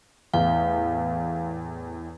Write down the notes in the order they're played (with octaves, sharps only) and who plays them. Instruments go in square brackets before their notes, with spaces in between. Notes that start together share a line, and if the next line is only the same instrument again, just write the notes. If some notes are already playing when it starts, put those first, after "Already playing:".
[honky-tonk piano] E2 A2 [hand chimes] F5